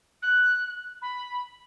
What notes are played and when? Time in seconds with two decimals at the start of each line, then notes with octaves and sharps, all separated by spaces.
0.22 F#6
1.02 B5